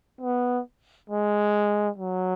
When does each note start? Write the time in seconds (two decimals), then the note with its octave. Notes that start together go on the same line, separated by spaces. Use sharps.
0.21 B3
1.10 G#3
1.98 F#3